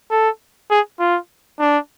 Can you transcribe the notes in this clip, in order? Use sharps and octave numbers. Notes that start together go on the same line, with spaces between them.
A4
G#4
F4
D4